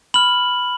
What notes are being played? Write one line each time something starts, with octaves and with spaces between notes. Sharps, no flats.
B5 F6 F#7